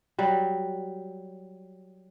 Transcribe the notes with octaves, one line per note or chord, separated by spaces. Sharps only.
F#3 G3